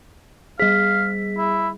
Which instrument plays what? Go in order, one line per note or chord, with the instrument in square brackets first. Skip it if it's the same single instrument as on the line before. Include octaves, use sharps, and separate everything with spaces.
[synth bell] G3 G#4 [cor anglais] F5 [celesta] B6
[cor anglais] E4